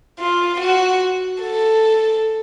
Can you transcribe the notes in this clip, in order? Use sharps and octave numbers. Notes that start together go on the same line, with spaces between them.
F4
F#4
A4